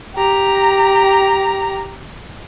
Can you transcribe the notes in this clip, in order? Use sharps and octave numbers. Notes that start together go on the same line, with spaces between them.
G4 A#5